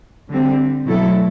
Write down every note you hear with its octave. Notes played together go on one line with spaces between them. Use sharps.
D3 G3 C4
B2 F#3 A3 E4 A4